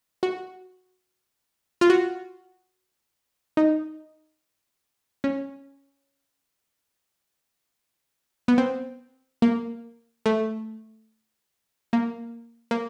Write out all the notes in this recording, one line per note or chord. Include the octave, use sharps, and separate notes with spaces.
F#4
F4
F#4
D#4
C#4
B3
C4
A#3
A3
A#3
A#3